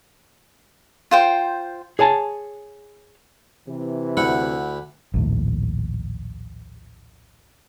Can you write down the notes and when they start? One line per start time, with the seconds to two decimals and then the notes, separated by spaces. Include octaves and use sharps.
1.11 F4 C5 G5
1.99 G#4 C#5 G#5 A5
3.68 C3 E3
4.17 D2 E4 F#5
5.14 A#1 D#2 A2